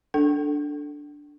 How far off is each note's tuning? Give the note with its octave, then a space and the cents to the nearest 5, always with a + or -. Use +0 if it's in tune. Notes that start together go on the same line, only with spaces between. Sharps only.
D4 +0 A4 +0 G5 -45